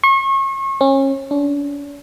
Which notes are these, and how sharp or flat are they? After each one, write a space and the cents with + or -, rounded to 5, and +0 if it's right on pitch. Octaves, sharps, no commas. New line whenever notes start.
C#6 -35
C#4 -30
D4 -45